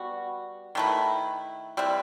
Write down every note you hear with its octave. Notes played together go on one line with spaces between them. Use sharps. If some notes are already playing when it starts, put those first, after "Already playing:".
Already playing: G3 B3 F#4
D#3 A3 E4 B4
G3 C4 E4 B4